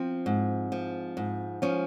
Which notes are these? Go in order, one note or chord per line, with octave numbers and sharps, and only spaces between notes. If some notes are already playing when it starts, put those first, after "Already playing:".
Already playing: F3 C4
G#2
F3
G#2
F3 C#4